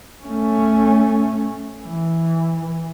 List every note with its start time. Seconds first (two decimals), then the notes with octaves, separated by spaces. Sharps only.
0.24 A3 C#4
1.83 E3